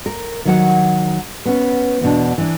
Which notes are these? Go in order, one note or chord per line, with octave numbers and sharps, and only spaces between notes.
A#4
D#3 F#3 F#5
B3 C#4
E2 B2 D4
E3 D4